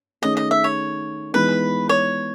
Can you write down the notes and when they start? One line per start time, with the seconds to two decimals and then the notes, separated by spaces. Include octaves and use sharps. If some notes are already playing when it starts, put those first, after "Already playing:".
0.22 D#3 A3 C#4 G#4 D#5
0.37 D#5
0.51 E5
0.64 C#5
1.33 E3 G#3 B3 D#4 B4
1.89 C#5